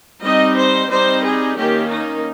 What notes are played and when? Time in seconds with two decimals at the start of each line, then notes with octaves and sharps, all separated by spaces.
0.22 G3 C4 D#4 D#5
0.56 C5
0.89 G3 C4 D#4 C5
1.23 G#4
1.56 D#3 A#3 C#4 G4
1.89 D#4